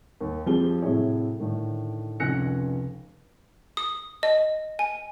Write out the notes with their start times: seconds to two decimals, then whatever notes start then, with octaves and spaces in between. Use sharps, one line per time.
0.21 D#2
0.46 F2 F3 C4 G4 G#4 G7
0.82 A2 C3 F#3 E4 G#4 C#5
1.40 A2 D3 D#3
2.20 F1 C#2 G#5 F#6 A#6 C#7
3.77 D#6
4.23 D#5
4.79 G#5